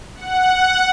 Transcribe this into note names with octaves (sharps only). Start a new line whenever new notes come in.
F#5